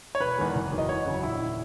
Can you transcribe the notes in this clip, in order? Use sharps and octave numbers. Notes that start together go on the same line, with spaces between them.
C#5
E1 B4
E2 D#3 G#3
F#1
E2 D#3 F#3
D#5
E2 C#5
C#3 F#3
A#1 E4
D#3